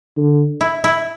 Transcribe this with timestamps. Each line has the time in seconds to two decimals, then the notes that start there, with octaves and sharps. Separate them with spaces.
0.17 D3
0.61 E4
0.84 E4